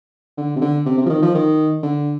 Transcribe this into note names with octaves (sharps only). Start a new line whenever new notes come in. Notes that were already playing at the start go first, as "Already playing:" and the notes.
D3
C3
D3
C3
C3
F3
D#3
F3
D#3
D3